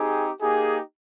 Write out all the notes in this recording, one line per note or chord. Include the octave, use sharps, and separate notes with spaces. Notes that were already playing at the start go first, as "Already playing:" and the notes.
Already playing: C4 D#4 G4 G#4
A#3 D#4 G4 G#4